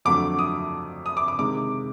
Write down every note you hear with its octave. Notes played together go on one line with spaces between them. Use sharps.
F2 D3 F#3 A3 D6
D#6
D#6
D6
D6
C3 D#3 G#3 D6